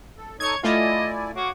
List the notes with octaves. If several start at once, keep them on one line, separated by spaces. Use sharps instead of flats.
A4
D#4 A4 C#5 D#6 G#6
A3 E4 F4 D5 D#5 G#5
F#4 C#5 F5 D6